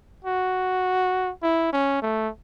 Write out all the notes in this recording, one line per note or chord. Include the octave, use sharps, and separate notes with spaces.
F#4
E4
C#4
A3